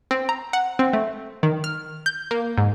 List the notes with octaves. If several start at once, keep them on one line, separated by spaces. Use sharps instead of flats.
C4
A#5
F#5
C4
A3
D#3
F6
G6
A#3
G#2